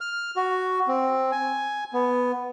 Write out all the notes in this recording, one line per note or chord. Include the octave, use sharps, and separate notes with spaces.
F6
F#4
C4
G#5
B3